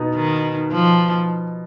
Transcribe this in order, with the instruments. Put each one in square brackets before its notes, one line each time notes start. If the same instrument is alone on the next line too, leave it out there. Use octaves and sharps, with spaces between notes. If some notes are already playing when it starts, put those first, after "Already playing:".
Already playing: [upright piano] B2 B3 D#4
[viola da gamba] D#3
F3